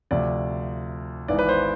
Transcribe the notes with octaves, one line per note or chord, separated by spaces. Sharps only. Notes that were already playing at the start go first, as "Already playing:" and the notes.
D2 C3 F3 D5
G#1 G#2 E3 B3 D5
B4
C5